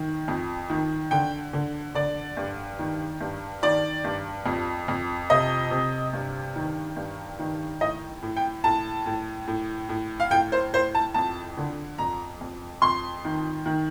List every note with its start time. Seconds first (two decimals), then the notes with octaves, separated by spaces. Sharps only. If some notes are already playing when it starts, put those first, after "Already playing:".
Already playing: D#3
0.28 F2
0.70 D#3
1.11 D3 G5
1.53 D3
1.95 D3 D5
2.37 G2
2.79 D#3
3.21 G2
3.62 D#3 D5
4.04 G2
4.46 F2
4.88 F2
5.30 C3 D#5
5.71 C3
6.13 G2
6.55 D#3
6.96 G2
7.39 D#3
7.81 A2 D#5
8.22 A2
8.37 G5
8.64 A2 A5
9.06 A2
9.47 A2
9.89 A2
10.20 F5
10.31 A2 G5
10.52 C5
10.73 A2 C5
10.95 A5
11.14 F2 A5
11.57 D3
11.98 F2 A#5
12.41 F2
12.82 F2 C6
13.25 D#3
13.66 D#3